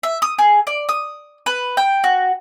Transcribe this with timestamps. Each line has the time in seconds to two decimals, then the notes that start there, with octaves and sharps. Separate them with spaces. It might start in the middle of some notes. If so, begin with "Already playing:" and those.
0.03 E5
0.22 D#6
0.38 G#4
0.67 D5
0.89 D#6
1.46 B4
1.77 G5
2.04 F#4